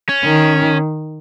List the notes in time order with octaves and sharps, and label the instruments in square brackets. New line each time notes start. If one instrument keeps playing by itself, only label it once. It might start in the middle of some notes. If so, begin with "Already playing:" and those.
[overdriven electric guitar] C#4
[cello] D#3